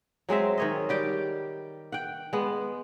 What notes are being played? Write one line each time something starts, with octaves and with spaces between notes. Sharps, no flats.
F#3 G#3 C4 E5
D#3 C#5 D#5
G3 G4 G5
F#5 G5
G#3 B3